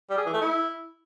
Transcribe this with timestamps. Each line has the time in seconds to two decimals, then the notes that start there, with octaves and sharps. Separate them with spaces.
0.10 G3
0.18 G#4
0.26 E3
0.33 A3
0.41 E4